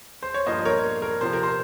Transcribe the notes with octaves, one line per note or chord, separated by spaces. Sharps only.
C5
C#5
G2 F3 A#3 C5 D#5
A#4 C#5
A#4
C3 F3 C4 C5
A#4
C5